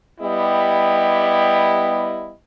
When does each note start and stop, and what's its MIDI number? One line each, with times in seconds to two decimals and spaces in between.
0.20 2.32 55
0.20 2.32 59
0.20 2.32 64
0.20 2.32 67
0.20 2.32 75